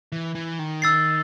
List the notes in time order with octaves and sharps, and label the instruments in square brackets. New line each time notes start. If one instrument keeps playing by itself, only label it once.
[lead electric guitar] E3
E3
D#3
[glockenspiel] E6 A6 C7